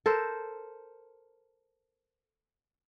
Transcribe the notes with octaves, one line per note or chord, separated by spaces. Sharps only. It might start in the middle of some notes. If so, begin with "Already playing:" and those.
A4 A#4 C5